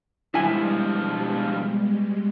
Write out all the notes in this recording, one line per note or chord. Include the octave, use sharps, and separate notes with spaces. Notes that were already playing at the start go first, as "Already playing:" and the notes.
G2 B2 F3 G3 G#3 E4 G#5